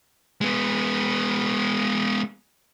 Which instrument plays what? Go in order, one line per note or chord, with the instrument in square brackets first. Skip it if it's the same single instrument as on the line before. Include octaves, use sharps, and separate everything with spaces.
[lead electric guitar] G#3 B3